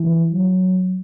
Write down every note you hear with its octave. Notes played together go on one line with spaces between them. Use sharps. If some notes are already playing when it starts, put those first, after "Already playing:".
Already playing: E3
F#3